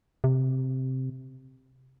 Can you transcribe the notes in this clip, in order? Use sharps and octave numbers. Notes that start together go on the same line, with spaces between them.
C3